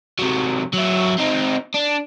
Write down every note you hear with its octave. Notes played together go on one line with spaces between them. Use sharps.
C3 F#3
F#3 E4
C4 D#4
D4